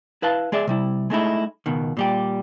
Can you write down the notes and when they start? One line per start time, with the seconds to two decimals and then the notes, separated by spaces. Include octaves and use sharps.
0.22 E4 B4 F5 A5
0.52 G#3 G#4 D5 E5
0.67 C3 G3 E4
1.10 G#3 A3 D#4 E4
1.66 C#2 B2 D#3
1.97 A#2 G3 G4